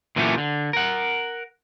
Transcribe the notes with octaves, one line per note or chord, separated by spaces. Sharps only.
A#2 E3 F#3 A3 C#4 G4
D3
A#4 F#5